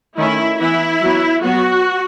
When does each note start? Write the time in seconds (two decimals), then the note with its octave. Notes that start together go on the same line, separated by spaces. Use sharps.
0.18 D#3 A3 C#4 E4
0.60 E3 B3 E4
1.01 F#3 B3
1.43 F#3 B3 F#4